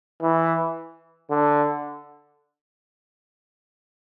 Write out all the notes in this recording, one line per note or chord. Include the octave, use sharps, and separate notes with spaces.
E3
D3